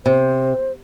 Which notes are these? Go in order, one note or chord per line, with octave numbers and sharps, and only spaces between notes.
C3 C5